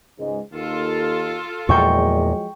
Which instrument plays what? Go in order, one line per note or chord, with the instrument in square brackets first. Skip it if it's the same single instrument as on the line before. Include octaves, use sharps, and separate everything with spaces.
[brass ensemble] C#2 G#2 G#3
[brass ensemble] D#2 [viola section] F4 A4
[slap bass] E2 A#2 [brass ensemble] F3 F#3 G#3 [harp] G5 C#6